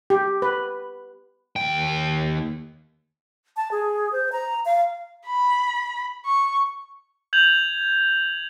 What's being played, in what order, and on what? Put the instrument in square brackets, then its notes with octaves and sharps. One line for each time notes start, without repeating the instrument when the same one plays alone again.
[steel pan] G4
B4
[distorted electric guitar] D#2 G5
[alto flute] A5
G#4
C5
A#5
F5
[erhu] B5
C#6
[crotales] G6 G#6 F7 F#7